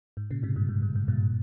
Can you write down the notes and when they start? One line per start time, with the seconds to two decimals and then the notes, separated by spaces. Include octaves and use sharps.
0.17 G#2
0.31 A#2 C#3
0.43 G#2 C3
0.56 G2 A#2
0.69 G#2
0.82 G2
0.95 G#2
1.08 G2 A#2